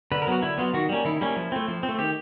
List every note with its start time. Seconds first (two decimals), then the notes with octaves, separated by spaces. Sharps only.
0.12 D3 B4
0.22 A#4
0.27 F#3 B3 F#4
0.42 D3 E4
0.58 F#3 B3 F4
0.74 D#3 F#4
0.89 G3 A#3 C#4
1.05 D#3 E4
1.21 G3 A#3 C#4 E4
1.36 F3
1.52 A3 C4
1.68 F3
1.83 C4
1.89 A3
1.99 D#3 G4